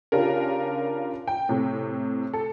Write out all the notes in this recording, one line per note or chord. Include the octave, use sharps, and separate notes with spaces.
C#3 D4 F4 G4 A#4
G5
A2 C3
A4